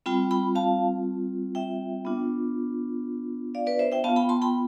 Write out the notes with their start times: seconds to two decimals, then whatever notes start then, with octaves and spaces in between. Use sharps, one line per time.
0.06 G3 C4 F4 G5 B5
0.31 G5 B5
0.55 F5 A5
1.55 E5 G5
2.05 B3 D4 F4
3.55 D5 F5
3.67 B4 D5
3.79 C5 E5
3.92 E5 G5
4.04 B3 F4 F5 A5
4.16 G5 B5
4.29 A5 C6
4.42 G5 B5